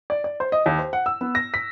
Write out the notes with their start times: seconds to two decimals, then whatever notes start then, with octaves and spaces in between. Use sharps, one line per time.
0.10 D5
0.24 D5
0.40 C5
0.52 D#5
0.66 D#2
0.79 C5
0.93 F#5
1.06 E6
1.21 B3
1.35 A#6
1.54 B6